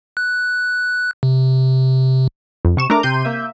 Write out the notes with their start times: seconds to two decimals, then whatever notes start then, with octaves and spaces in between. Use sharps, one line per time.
0.17 F#6
1.23 C3
2.65 F2
2.77 C3 C#6 E7
2.90 A3 D4 A#4 A#5 D6
3.03 C3 C6 G6 D#7
3.25 A#3 E5